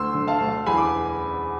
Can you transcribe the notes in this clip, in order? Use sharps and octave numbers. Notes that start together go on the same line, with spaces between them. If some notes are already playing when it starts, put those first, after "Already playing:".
Already playing: D2 C6 E6
D3
F5 A5
D2
E2 G#5 B5
D6